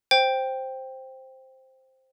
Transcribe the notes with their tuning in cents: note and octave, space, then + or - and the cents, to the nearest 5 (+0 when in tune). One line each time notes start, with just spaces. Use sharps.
C5 +5 G5 +0